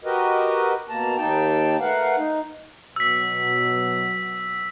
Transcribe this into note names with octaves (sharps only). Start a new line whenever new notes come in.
F#4 G4 A#4 B4 D#5
B2 A#3 A5 A#5
D#2 A#3 D#4 G5 A5
A3 A#4 B4 F5 F#5
D#4
B2 F#3 E6 B6